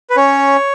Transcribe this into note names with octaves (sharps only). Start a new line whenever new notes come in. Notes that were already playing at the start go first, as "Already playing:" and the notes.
B4
C#4 C#5